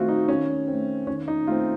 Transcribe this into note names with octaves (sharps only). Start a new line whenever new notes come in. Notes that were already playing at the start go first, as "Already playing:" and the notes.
Already playing: D#3 A3 C4 F4 F#4
D#4
D#3 C#4
A3 C4
D#3 C#4
D#4
A3 C4 F4